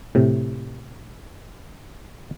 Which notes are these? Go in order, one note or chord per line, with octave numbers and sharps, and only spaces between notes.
A2 C3